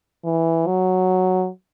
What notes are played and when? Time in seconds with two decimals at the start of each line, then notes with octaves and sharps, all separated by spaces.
0.24 E3
0.67 F#3